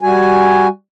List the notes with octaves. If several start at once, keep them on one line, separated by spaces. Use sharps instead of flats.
G3 F#4 G#5